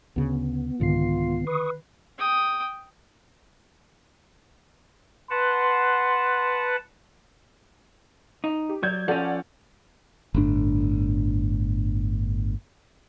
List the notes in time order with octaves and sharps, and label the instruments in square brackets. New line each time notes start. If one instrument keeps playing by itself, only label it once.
[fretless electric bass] D2 C#3 [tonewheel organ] B3
[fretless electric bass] C2 G#2 [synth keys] D3 D#3 C7 [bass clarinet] F4
[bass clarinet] B4 [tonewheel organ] C#6 D#6
[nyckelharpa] G5 D#6
[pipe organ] B4 F#5 A5 [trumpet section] C6
[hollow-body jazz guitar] D#4
[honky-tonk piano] G4
[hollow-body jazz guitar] F#3 [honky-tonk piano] D5 G6 G#6
[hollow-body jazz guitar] F3 C#4 [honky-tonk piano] A4 D5 F#5
[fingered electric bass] G1 A2 D4